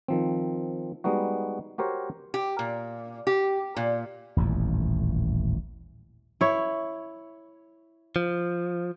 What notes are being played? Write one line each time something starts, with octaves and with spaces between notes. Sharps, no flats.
D#3 F3 C4
G3 G#3 B3 D#4 F#4
F#4 G4 A#4 C5 C#5
G4
A#2
G4
A#2
D#1 A1 F2
E4 C#5
F3